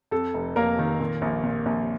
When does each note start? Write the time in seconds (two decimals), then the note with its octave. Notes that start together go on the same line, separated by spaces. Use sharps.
0.11 F2 A4
0.34 F1
0.56 F1 A#3 A#4
0.79 D#3
1.00 A#2
1.22 A#1
1.44 A#2
1.66 A#1